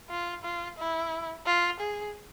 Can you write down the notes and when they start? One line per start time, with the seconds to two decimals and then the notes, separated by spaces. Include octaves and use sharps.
0.10 F4
0.44 F4
0.77 E4
1.46 F4
1.80 G#4